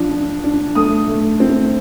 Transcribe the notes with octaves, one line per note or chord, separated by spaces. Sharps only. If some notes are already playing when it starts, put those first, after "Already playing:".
Already playing: F3 D4
D4
D4
A3 D#6
A3
C4